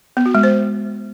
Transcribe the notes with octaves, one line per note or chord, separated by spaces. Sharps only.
B3
F#4
G#3
C5